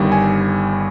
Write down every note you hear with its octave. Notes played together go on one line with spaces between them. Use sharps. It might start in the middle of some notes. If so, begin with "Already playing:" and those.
Already playing: G1 G2 D#3 G3
G#5